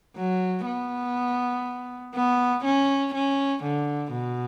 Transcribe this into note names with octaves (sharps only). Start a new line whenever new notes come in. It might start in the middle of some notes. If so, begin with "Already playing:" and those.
F#3
B3
B3
C#4
C#4
D3
B2